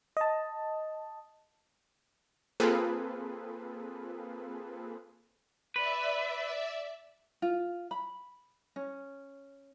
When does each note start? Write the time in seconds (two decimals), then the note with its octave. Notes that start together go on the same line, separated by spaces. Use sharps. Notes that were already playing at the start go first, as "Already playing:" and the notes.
0.17 D#5 A5
2.60 A#3 C4 F4 G#4 A4 B4
5.76 B4 D5 E5
7.42 F4
7.91 B5
8.76 C#4